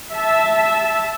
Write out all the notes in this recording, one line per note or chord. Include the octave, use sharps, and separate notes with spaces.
E5 A5